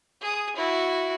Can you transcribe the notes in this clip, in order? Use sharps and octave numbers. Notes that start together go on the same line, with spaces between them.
G#4 D#6
E4 F#4